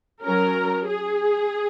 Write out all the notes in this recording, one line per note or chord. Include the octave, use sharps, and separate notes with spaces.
F#3 C#4 A#4
G#4